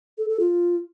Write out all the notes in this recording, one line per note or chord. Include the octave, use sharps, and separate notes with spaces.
A4
A4
F4